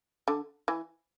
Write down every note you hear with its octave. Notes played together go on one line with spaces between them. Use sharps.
D3
E3